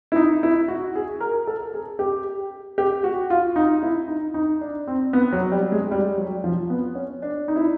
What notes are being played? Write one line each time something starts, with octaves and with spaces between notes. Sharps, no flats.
E4
D#4
E4
F#4
G#4
A#4
A4
G#4
G4
G4
F#4
F4
D#4
E4
D#4
D#4
D4
C4
B3
F#3
G3
G#3
G3
F#3
F3
B3
C#4
D4
D#4
E4